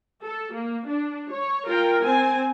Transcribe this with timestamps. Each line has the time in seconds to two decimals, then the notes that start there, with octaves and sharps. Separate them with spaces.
0.24 A4
0.53 A#3
0.87 D4
1.31 C#5
1.66 F4 A#4 G5
2.03 C4 G#5